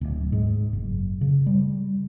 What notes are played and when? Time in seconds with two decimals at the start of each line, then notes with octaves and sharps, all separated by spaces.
0.01 D1
0.32 G#2
0.73 F#1
1.21 C#3
1.46 G3